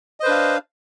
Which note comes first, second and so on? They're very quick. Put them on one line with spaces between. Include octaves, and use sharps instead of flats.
D#5 C5 B4 D4 F5